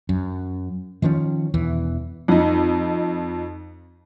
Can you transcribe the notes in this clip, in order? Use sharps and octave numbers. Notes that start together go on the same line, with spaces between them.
F#2
D#3 F3 A#3 C#4
E1 E2 E3
F2 D#4